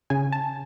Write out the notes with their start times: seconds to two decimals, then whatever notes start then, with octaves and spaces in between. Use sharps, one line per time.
0.10 C#3 G#5
0.32 A5